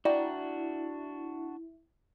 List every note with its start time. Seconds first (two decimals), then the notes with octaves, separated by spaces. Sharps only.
0.05 D4 E4 F#4 D5 G5 A#5